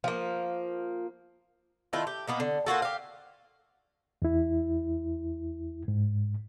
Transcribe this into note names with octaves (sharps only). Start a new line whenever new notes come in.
F3 A#3
D#3 A3 E4 F4
G4
B2 A#3 B3
D3
A#3 F4 F#4 A4
G4 F5
E2 E4
G#2